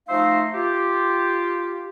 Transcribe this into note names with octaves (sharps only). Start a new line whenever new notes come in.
F3 A3 D#4 C5 E5 F5
F4 G4